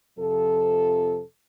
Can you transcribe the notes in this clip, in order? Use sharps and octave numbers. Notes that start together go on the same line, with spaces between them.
F2 C3 F3 A4